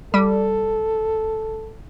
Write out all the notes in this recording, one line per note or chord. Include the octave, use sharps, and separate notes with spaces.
G3 A4